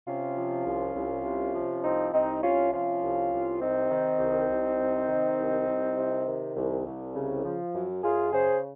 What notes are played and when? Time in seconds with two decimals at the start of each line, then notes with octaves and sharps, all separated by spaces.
0.05 C3 C#4 F4
0.35 F3
0.64 C2
0.94 C2
1.24 C3
1.53 F3
1.83 C2 C4 D#4
2.12 C2 C4 D#4
2.42 C3 C#4 F4
2.72 F3 C#4 F4
3.01 C2
3.31 C2
3.60 C3 C4 D#4
3.90 D#3
4.19 C2
4.48 C2
4.79 C3
5.08 D#3
5.38 C2
5.66 C2
5.96 C3
6.26 D#3
6.55 C2
6.85 C2
7.15 C#3
7.44 F3
7.73 F#2
8.03 F#2 F4 G#4
8.32 C#3 G#4 C5